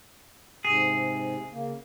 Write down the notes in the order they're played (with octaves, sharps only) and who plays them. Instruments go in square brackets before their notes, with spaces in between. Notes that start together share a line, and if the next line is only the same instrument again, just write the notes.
[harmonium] G#2 C3 [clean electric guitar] G#4
[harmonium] C#3 A#3